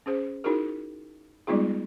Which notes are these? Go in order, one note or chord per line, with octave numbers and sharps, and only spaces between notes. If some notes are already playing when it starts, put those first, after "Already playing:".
C#4 G#4 C5
D#4 E4 F#4 G#4 A#4
G3 G#3 B3 D#4 F4 G#4